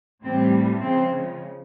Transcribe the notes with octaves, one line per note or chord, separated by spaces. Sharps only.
A2 E3 G3 C4
C#3 F3 G#3 C4